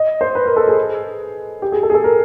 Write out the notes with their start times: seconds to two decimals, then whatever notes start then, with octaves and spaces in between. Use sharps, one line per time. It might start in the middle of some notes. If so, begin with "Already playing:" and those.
Already playing: D#5
0.21 C5
0.35 B4
0.46 A#4
0.56 A4
0.67 G#4
1.62 G4
1.72 G#4
1.83 A4
1.90 G#4
1.94 A4
2.04 A#4